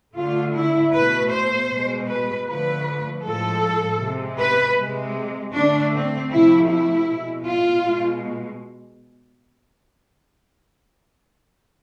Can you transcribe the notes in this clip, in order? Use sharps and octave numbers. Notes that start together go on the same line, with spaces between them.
D3 A3 F4
E4
B2 A3 B4
C5
B2 G#3
B4
D3 F3 A3 B4
A2 F3 G#3 A4
C3 G#3
B4
C3 G#3
D3 A3 D4
C4
C3 F3 A3 E4
E4
B2 G#3
F4
B2 G#3